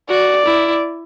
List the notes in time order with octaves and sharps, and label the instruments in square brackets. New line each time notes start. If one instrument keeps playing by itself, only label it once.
[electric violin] F#4 [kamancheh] D5
[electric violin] E4